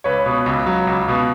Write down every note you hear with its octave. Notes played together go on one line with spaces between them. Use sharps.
C#2 B4 C#5
B2
C#2
F#3
C#2
B2